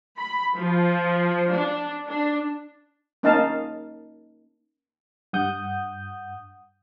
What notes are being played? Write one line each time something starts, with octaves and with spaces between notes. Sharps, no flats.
B5
F3
D4
D4
A#3 C#4 D#4 D#5 F5 A5
G2 F#5 D#6 G6